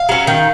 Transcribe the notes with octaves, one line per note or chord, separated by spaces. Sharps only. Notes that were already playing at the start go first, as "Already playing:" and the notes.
Already playing: F5
F#3 C#4
D#3